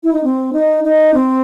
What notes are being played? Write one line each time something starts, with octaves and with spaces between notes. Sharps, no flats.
E4
D#4
C4
D#4
D#4
C4